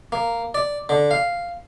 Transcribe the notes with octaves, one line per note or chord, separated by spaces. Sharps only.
A#3
D5
D3
F5